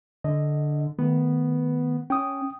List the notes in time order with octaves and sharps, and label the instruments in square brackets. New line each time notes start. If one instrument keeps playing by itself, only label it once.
[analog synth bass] D3 [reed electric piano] D#5
[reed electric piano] D#3 A3 [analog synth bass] B3
[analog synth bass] C#4 [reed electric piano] G5 D#6